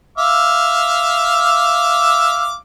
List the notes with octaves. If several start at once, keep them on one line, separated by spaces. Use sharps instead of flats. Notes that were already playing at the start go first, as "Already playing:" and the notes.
E5 F5 D6